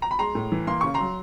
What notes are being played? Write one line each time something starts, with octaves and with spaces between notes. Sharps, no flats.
A#5
B5
G#3 A#5 C6
A2
E3
A#3 C6
C#3 C#6
A#5 C6
F#3